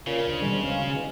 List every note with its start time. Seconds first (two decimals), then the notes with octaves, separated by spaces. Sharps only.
0.07 A#2 C#3 C#4 F4
0.27 D2 D4 C5
0.42 B2 D#3 G3 G#3
0.63 C#4 F5
0.79 F#3
0.96 E2 D#4 F#4